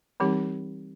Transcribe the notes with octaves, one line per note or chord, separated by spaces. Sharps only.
E3 G3 C4 D#4 G4